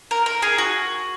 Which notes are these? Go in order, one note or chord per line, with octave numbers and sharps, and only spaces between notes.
A#4
A#4
G#4
F#4